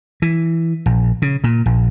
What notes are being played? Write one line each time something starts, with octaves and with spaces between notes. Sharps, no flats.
E3
A#1
C#3
A#2
A#1